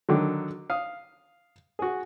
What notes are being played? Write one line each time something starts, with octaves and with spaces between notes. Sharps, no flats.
D3 D#3 F#3
F5 D#6
F#4 G#4